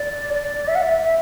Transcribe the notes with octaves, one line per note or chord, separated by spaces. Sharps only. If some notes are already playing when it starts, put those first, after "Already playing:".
Already playing: D5
D5
E5
F#5
E5
E5